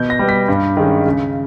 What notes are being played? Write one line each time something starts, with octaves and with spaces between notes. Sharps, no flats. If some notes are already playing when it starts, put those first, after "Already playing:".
Already playing: B2 G6
A#6
G3 B3
B6
G2
D#3 G#3 C#4
C#3